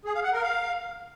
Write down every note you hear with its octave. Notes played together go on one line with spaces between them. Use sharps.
G#4
F5
F#5
A#4
F5